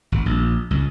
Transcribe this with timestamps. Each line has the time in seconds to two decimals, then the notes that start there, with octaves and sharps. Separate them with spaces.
0.12 G#1
0.26 A#1
0.71 C#2